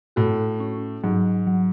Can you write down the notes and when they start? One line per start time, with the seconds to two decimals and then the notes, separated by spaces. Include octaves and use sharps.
0.16 A2 F#4
0.60 C#4
1.04 G#2 F#3
1.47 F#3